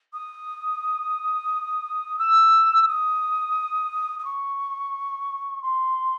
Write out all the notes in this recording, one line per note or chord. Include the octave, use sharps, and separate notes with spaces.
D#6
E6
D#6
D#6
C#6
C6